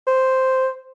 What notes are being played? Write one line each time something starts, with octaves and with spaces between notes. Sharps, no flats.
C5